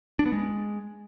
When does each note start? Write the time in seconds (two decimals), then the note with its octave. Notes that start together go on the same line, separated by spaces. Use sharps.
0.19 D4
0.26 B3
0.32 G#3